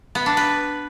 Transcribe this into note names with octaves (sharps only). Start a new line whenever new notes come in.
B3
D4
B4